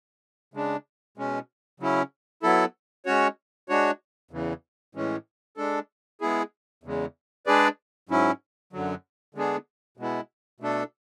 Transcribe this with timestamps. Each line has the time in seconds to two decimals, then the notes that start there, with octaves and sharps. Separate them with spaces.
0.54 C#3 G#3 D4
1.18 B2 G#3 C#4
1.80 C#3 F#3 C#4 E4
2.43 F#3 B3 E4 A4
3.06 G#3 C#4 F#4 C#5
3.69 G#3 D4 F#4 C#5
4.31 E2 C#3 E3
4.95 A2 E3 G#3 C#4
5.57 G#3 D4 A4
6.21 G#3 B3 E4 G#4
6.84 E2 C#3 G#3
7.46 G#3 D4 G#4 B4 D5
8.09 G#2 F#3 C#4 E4
8.73 F#2 D3 F#3
9.35 D3 G#3 B3 D4 G#4
9.97 B2 G#3 B3 E4
10.60 B2 A3 D4 A4